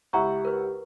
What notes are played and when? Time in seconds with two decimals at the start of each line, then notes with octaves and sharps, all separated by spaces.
0.13 C#2 E4 G4 F#5 A#5 C#6
0.45 A#4 B4